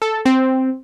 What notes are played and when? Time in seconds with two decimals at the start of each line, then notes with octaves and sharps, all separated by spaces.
0.02 A4
0.25 C4